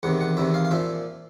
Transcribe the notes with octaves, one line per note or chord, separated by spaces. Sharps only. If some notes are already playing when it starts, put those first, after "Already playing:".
E2 C3 D#3 F#5
F#5
E2 C3 D#3 E5
F5
F5
A#2 F3 E5